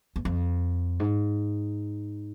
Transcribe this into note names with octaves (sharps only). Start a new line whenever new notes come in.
E2
F2
G#2